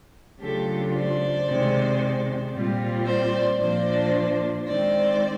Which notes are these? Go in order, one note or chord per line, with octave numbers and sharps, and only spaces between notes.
C#3 F#3 A3 D4 F4 G4 A4
C5 D5
C3 D#3 G#3
A#2 G3 C4 F4
C5 D5
A#2 F3 A#3 D4 F4 C5 D5
D#3 G#3 C4 C5 D5